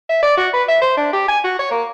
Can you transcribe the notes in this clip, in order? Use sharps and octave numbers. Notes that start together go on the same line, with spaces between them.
E5
D5
F#4
B4
E5
C5
D4
G4
G#5
F#4
C#5
A#3